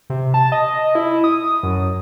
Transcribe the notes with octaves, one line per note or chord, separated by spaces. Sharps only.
C3
A5
D#5
E4
D#6
F#2